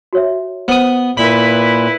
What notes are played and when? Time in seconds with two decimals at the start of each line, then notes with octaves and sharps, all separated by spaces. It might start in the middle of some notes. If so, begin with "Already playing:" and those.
0.13 F#4 C#5 E5
0.68 B3 C5 D#6
1.17 A#2 E4 B4 B5